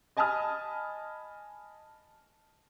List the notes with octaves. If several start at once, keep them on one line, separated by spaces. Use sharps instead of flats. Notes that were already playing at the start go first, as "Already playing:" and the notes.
D#5 G#5 A5 B5 D#6 F6